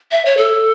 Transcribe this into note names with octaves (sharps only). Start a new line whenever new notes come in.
E5
C#5
A4